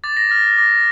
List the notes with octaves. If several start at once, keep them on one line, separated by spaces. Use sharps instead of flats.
D6 A6
A#6
F6 A6
D6 A#6